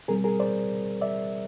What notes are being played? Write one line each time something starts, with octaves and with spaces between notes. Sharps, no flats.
B2 G3 C4 G#4 A#4
G#4 A#4
C5 D5
D5 E5